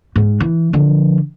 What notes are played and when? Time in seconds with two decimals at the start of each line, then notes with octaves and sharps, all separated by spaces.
0.16 G#2
0.40 E3
0.73 D3 F3